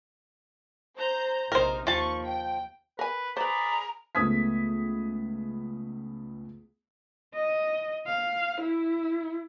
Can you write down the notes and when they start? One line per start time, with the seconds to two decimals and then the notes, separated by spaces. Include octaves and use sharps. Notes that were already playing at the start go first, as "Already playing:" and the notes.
0.98 C5 A#5 G6
1.52 A#1 C3 D#4 A#4 C5
1.87 D#2 F3 A5 C#6
2.25 G5
2.99 A#4 B4 G#5
3.37 G#4 B4 C5 D5 A#5 B5
4.15 C#2 A3 B3 D#6 G#6 B6
7.35 D#5
8.07 F5
8.61 E4